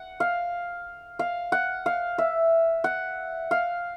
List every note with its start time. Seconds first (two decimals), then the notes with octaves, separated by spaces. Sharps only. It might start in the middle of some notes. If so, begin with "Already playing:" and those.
Already playing: F#5
0.20 F5
1.19 F5
1.52 F#5
1.86 F5
2.18 E5
2.84 F#5
3.51 F5